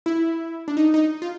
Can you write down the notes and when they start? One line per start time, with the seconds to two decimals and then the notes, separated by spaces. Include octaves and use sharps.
0.06 E4
0.68 D4
0.77 D#4
0.94 D#4
1.22 F4